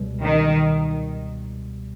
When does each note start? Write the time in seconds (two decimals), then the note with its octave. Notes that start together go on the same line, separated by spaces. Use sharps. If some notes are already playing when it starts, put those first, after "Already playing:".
Already playing: C#2 B2 G3
0.22 D#3